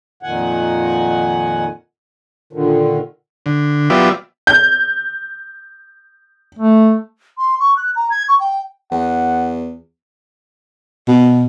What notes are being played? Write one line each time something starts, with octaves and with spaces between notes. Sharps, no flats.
F2 A#2 D#3 F#5 G#5
A#2 D3 D#3
D3
F#3 B3 F4 G4 D5 E5
G6
A3
C6
C#6
F#6
A#5
G#6
C#6
G5
E2 F#5
B2